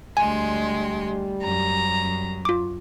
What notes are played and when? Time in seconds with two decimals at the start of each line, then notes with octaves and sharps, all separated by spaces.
0.17 D2 G3 G#3 G#5 C6
1.43 F#2 A#5
2.45 F4 D6